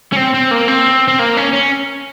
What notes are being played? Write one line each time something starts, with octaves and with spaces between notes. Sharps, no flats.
C#4
C4
C4
A#3
C4
C4
A#3
C#4
C#4